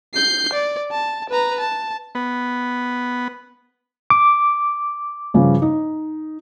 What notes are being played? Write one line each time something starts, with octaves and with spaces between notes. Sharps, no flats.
G6 C7
D5
A5
B4 A#5
A5
B3
D6
G2 C#3 F3
D#4